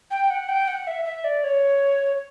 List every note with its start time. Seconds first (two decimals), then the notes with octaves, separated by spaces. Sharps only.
0.11 G5
0.30 F#5
0.49 G5
0.68 F#5
0.87 E5
1.05 E5
1.24 D5
1.44 C#5